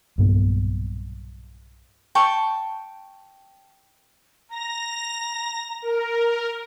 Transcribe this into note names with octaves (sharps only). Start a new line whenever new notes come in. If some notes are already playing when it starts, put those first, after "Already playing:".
B1 G2 A#2 B3
G5 A5 C#6
A#5 A#6
A#4